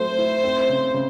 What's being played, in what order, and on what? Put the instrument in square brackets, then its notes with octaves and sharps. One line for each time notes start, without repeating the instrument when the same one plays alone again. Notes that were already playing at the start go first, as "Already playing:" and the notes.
Already playing: [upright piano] F#3 A3 C4 [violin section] C5
[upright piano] E4
C4
C#3
C#3